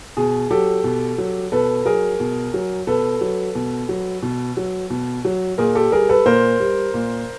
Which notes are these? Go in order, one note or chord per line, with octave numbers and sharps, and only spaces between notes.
B2 G#4
F#3 G4 A4
B2
F#3
B2 A4 B4
F#3 G#4 A#4
B2
F#3
B2 A4 B4
F#3
B2
F#3
B2
F#3
B2
F#3
A#2 G#4 A#4
G4 A4
G3 G#4 A#4
A4 B4
A#2 A#4 C5
G3
A#2